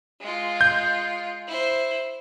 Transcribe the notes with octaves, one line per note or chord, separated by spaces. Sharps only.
G#3 F4
G6
E4 C5